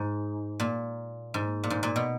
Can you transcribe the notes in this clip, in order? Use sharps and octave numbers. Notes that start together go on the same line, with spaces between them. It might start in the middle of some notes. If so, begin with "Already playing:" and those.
Already playing: G#2
A#2
G#2
A#2
G#2
A#2
B2